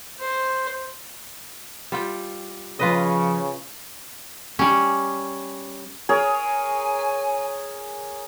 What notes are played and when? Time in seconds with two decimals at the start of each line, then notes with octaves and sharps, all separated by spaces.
0.20 C5
1.92 G3 F4 G5
2.79 C#3 F3 F4 B4 D#5
4.59 G3 C#4
6.09 G#4 A#4 C#5 G#5